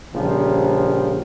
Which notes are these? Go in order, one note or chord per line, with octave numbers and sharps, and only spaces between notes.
A#1 C#3 F3 G3